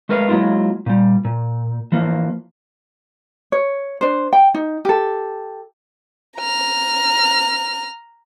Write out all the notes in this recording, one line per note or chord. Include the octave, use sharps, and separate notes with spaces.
G#3 A3 A#4 B4 E5 F5
F#3 G#3 A#3 E4 F4
A#2 G3
A#2
E3 F3 A#3
C#5
D4 C5
G5
D#4
G4 A4
A#5 F6